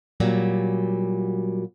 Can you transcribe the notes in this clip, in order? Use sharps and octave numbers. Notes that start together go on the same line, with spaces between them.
A#2 F#3 G3